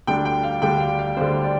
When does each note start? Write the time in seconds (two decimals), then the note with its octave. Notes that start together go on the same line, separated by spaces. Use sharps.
0.07 D2 D3 G3 D4 G5
0.25 G5
0.43 F5
0.62 D2 D3 G3 D4 G5
0.80 F5
0.99 F5
1.17 D2 D3 G3 D4 C5
1.44 D5